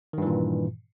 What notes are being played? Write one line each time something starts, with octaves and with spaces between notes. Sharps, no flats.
G2 A#2 D#3 E3